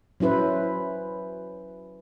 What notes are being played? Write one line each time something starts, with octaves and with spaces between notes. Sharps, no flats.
F#3 C#4 E4 B4 C5